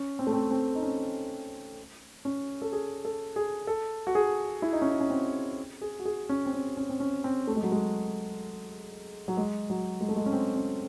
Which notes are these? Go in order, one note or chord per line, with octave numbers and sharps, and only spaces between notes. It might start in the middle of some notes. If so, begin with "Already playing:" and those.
Already playing: C#4
C4
A3
C4
C4
D#4
C#4
C#4
A4
G#4
A4
G#4
A4
F#4
G#4
E4
D#4
C#4
D#4
C#4
C4
G#4
F#4
G#4
C#4
C4
C#4
C#4
C4
C#4
C4
A3
G#3
F#3
G#3
F#3
G#3
F#3
G#3
A3
G#3
C#4
C4
C#4